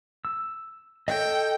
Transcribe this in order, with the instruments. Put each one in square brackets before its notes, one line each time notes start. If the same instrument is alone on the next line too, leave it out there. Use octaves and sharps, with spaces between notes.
[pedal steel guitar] E6
[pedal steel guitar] A4 C#5 D#5 [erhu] G5